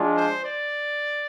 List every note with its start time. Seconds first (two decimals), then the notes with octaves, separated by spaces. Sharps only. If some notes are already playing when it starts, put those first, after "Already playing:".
Already playing: F3 G#3 D4 F4
0.15 C5
0.45 D5